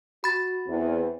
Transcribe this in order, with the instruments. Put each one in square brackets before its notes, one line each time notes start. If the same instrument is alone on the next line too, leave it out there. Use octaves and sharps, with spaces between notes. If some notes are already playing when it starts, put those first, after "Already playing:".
[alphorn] F#4 [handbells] B5 A6
[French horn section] E2 [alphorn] C4